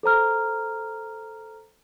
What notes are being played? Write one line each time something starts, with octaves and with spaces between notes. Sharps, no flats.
A4 C5 A#5 F6